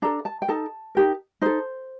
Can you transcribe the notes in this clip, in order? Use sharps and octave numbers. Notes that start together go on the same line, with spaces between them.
D4 A4 A#5
A5
G5
D#4 A4 A5
D#4 G4 A#4
D#4 A4 C5